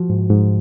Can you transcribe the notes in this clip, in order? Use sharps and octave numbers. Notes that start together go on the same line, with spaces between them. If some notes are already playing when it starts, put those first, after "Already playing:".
Already playing: F3 F#4
G#2
G#2